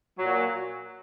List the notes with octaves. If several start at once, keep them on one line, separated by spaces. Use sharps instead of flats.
A#2 F#3